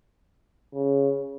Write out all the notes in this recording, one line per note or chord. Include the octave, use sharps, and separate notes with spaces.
C#3